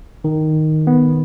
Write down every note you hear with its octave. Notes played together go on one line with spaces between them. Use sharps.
D#3
B3